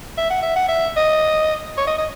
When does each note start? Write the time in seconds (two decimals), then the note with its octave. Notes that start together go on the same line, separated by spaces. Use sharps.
0.18 E5
0.30 F#5
0.43 E5
0.56 F#5
0.69 E5
0.97 D#5
1.78 C#5
1.87 D#5
1.98 D#5